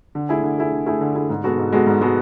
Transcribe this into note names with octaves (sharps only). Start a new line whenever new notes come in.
D3
A3 E4 G#4
D3
A3 E4 G#4
D3
A3 E4 G#4
D3
A3 E4 G#4
G#2
G#3 B3 F#4 A4
G#2
G#3 B3 F#4 A4
G#2
G#3 B3 F#4 A4